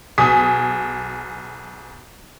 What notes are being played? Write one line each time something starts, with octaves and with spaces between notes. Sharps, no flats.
B1 G#4 G#5 D#6 B6